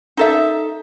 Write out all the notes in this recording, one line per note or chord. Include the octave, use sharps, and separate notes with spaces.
D#4 A4 E5